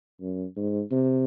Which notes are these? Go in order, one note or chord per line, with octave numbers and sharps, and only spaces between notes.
F#2
G#2
C3